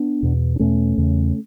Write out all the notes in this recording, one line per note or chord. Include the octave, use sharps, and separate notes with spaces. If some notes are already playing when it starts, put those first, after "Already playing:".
Already playing: B3 D4
E2 B2
D4
E2 B2 A3 C#4
E2 C#3